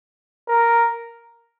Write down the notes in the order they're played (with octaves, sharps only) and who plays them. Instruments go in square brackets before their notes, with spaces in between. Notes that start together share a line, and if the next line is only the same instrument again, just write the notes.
[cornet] A#4